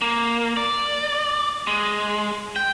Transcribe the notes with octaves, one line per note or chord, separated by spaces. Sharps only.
A#3
D5
G#3
G5